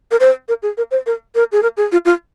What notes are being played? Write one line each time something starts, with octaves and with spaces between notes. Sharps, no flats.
A#4
C5
A#4
G#4
A#4
C5
A#4
A#4
G#4
A#4
G#4
F4
F4